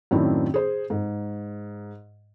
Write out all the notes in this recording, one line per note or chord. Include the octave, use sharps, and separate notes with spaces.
F#2 A2 D#3 C4 D4 E4
G#4 C5
G#2